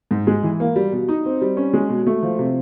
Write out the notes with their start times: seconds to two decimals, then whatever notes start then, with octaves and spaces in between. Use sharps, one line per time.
0.11 G#2
0.27 G#3
0.43 E3
0.60 A#3
0.76 G3
0.92 B2
1.08 D#4
1.25 C4
1.42 G3
1.57 C#4
1.73 G#3
1.89 B2
2.07 A3
2.23 F3
2.39 C3